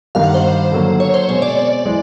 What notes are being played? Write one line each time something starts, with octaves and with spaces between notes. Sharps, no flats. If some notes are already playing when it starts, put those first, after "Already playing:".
G2 D#3 G3 F5
F#5
C5
D3 F#3 A#3
C#5
C5
B2 G#3 C4 C#5
D5
E3 G#3